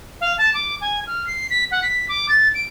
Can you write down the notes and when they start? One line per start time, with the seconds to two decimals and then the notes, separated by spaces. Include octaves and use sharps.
0.20 F5
0.38 A5
0.54 D6
0.81 G#5
1.07 F6
1.27 C7
1.50 B6
1.71 F#5
1.82 B6
2.08 D6
2.28 A6
2.54 D7